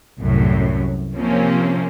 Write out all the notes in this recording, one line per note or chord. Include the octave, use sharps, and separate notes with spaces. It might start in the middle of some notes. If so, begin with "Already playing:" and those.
C2 F#2 A2 C3 F#3
C3 F3 A#3 C4 C#4